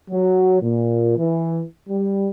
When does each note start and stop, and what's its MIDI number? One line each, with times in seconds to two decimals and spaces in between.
0.11 0.60 54
0.62 1.17 46
1.17 1.61 52
1.89 2.30 55